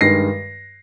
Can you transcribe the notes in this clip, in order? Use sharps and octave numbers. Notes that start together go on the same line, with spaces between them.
G2 D#3 G#3 A#6 C7